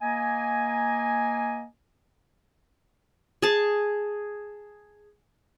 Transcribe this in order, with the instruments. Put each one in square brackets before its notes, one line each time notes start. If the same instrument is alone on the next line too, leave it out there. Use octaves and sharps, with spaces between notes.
[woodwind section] A#3 D#5 G#5
[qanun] G#4 A5